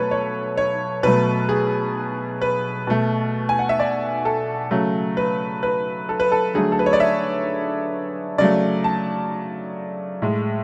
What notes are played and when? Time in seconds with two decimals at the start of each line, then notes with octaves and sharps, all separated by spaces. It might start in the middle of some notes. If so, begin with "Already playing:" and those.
Already playing: B2 F#3 A3 A4 B4 C#5
0.11 C#5
0.57 C#5
1.03 B2 F#3 A3 B4
1.49 G#4
2.42 B4
2.87 B2 A3
3.49 G#5
3.59 F#5
3.69 E5
3.80 D5
4.25 A4
4.71 C#3 F#3 A3
5.17 B4
5.63 B4
6.09 A4
6.20 B4
6.32 A4
6.54 D3 F#3 A3 G#4
6.72 A4
6.79 B4
6.86 C#5
6.93 D5
7.00 E5
8.38 C#3 F#3 A3 D5
8.84 A5
10.22 A2 G#3